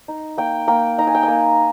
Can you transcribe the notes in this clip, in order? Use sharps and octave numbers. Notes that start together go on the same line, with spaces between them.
D#4
A#3 G5
A#3 G5
D#4 A#5
G#5
G5
G#5
A#3